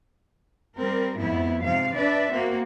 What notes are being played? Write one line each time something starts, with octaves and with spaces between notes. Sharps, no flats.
G3 C4 A#4
F2 G#2 B3 E4
G#2 C3 F3 F5
D4 B4 D5 E5
A#3 C4 F#4